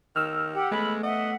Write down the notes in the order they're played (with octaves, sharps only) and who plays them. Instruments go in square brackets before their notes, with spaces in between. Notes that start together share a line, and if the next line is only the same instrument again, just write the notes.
[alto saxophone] D#3 [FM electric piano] E6 F6
[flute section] G4 F#5
[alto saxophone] G#3 [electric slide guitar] A3 B3 [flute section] B5
[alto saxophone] D#5 [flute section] E5 F#5